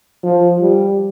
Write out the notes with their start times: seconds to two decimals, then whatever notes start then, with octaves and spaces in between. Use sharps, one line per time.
0.24 F3
0.61 G3